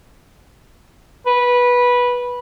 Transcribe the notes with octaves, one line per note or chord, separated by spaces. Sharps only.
B4